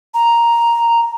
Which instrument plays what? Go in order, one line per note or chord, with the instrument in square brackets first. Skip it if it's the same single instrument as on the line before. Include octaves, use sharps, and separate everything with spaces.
[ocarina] A#5